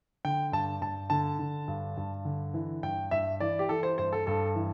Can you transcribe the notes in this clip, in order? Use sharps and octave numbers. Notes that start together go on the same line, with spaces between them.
D3 G5
G2 A5
G2 A5
D3 A5
D3
G2
G2
D3
E3
G2 G5
G2 E5
E3 D5
G4
E3 A4
C5
G2 C5
A4
G2 A4
E3